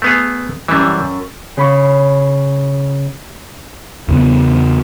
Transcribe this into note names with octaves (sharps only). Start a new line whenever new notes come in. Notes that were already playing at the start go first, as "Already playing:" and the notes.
A3 B3 G#4
F#2 E3 G3 E5
C#3 B5 C#6
E2 C#3 B3